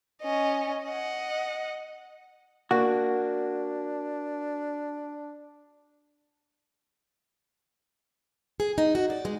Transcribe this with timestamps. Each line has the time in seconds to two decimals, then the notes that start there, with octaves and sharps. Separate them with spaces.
0.22 C#4 D#5
0.86 D#5 F#5
2.71 A#3 D4 F#4
8.60 G#4
8.78 D#4
8.95 F#4
9.10 D5
9.25 G#3